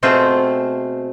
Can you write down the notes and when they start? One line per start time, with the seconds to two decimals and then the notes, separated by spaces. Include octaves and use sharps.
0.03 B2 A3 C4 F4 G#4 C5